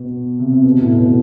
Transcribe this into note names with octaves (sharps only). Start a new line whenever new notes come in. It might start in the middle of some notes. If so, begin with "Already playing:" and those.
Already playing: B2
C3
C3
B2
A2
B2